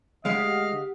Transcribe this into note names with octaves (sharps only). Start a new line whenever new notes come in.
D2 G#3 G4 D#5 F5 F#5 B6